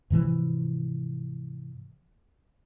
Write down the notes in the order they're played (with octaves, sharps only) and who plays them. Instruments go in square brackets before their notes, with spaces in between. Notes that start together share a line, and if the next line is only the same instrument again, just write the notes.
[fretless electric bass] G#2 C3 E3 F3